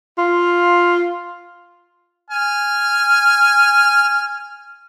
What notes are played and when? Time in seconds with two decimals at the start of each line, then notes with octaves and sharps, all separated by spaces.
0.18 F4
2.30 G#5 F6